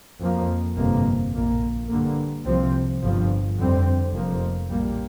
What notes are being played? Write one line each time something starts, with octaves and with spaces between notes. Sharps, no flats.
F2 F3 A#3
G1 F2 C3 A#3
A#1 A#2 A#3
G2 D3 A#3
C2 C3 F3 C4
G1 G2 F3
F2 D3 G3 C4
F1 F2 F3 A#3
A#1 A#2 G3 A#3